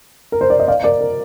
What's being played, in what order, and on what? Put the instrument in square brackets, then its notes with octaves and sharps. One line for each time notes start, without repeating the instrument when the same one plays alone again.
[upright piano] A#4
C5
D5
D#5
D5 F5
A#4 D5
A#4